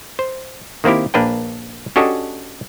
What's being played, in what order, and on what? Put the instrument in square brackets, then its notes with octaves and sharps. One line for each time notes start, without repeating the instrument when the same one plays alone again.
[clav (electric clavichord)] C5
D#3 A#3 C4 E4 G4
A#1 A#3 D4 B4 G5
C#4 D4 F#4 G4 A4 D#5